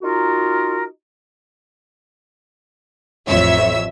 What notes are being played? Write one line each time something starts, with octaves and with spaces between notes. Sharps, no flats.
D#4 F4 F#4 A#4
A1 F2 C#5 E5 E6